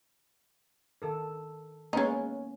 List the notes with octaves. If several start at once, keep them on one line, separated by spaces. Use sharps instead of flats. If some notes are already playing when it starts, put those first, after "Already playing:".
D#3 A4 A#4
G#3 A#3 B3 C#4 D#4